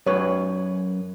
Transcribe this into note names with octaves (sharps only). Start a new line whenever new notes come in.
F#2 B4 C#5